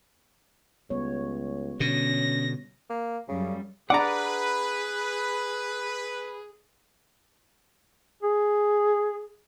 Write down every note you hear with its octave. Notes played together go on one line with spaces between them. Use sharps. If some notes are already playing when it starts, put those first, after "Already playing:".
C#2 G3 B3 C#5
B2 D3 C#4 A#6
A#3
F#2 C#3 G3
D4 G#4 B4 D5 F#5 A#5 D6
G#4